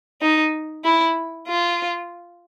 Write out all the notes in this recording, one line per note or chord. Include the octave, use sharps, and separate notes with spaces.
D#4
E4
F4